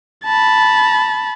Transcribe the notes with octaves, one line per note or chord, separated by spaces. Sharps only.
A5 B5